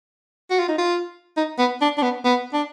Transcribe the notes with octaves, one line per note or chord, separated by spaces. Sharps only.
F#4
F4
D#4
F4
D#4
B3
D4
D4
B3
B3
D4